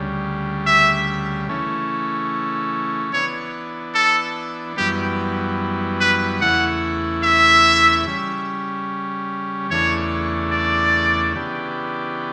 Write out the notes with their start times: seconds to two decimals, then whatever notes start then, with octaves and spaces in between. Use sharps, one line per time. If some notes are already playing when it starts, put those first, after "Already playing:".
Already playing: D2 C#3 G3
0.67 E5
1.49 C#3 E3 A3 C#4
3.13 E3 B3 D4 C#5
3.95 A4
4.77 F#2 E3 G3 B3 G4
6.01 B4
6.41 E2 C#3 E3 A3 E4 F#5
7.24 E5
8.06 C#3 G3 C#4
9.70 E2 C#3 E3 A3 D4 C#5
10.52 D5
11.35 C#3 E3 B3 D4 G4